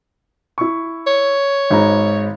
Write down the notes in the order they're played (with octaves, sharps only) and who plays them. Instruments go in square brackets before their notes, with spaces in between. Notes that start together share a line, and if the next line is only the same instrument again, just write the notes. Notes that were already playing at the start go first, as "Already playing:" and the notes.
[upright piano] E4 C#6
[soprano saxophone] C#5
[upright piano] G#1 G#2 A#5